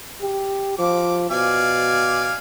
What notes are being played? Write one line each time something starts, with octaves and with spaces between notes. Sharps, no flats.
G4
F3 D6
B2 D5 F5 G#5